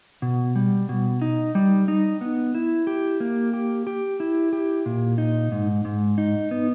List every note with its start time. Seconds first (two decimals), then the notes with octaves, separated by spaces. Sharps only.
0.22 B2
0.56 G3
0.89 B2
1.22 D#4
1.55 G3
1.88 D#4
2.21 B3
2.55 E4
2.87 G4
3.20 A#3
3.53 G4
3.87 G4
4.20 E4
4.53 G4
4.86 A#2
5.18 D#4
5.52 G#2
5.85 G#2
6.18 D#4
6.51 B3